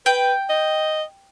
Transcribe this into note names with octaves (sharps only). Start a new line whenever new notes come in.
B4 G5
D#5